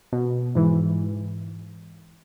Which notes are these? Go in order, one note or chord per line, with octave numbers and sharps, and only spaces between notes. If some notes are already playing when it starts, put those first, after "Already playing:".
B2
G#2 E3